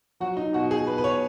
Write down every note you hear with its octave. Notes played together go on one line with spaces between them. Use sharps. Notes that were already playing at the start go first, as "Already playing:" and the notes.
F#3 F#4
D#4
B2 F#4
G#4
B2 B4
B4
C#5